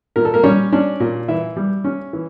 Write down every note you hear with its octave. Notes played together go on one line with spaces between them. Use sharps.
A#2 A#4
A4
A#3 A#4
G3 C#4 C#5
C#4 D4 D5
A#2
E3 E4 E5
G3
C#4
E3